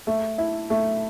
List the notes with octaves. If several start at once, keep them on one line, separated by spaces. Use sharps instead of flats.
A3
E4
A3